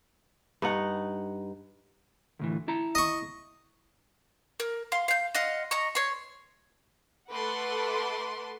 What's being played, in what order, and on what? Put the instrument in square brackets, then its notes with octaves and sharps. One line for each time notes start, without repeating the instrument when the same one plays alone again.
[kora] G2 D#4 F#5
[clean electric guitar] D2 A2 E3
E4 A5 A#5
[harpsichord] D#5 C#6
[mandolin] A#4
F5 C6
F5 G6
D#5 F5 F#5 C6
D#5 A#5 C#6
C#5 C6
[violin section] A3 A4 B4 F#5 C6 D6